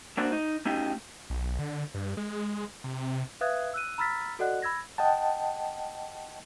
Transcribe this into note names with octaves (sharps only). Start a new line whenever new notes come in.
A3 A#3 D4 F#4 C5 D5
D#4
A3 C#4 D#4 G4
B1
D3
G2
G#3
C3
B4 E5 F5 D#6 F#6 G#6
E6 F#6 D#7
A#5 B5 E6 F6 A6 B6
F#4 A4 D5 D#5 F#5 F#6
B5 E6 G#6 A#6
D#5 F#5 G5 A5